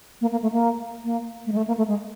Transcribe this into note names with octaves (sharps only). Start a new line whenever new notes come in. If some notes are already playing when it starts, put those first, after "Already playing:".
A#3
A#3
A3
A#3
A#3
A3
G#3
A3
A#3
A3
G#3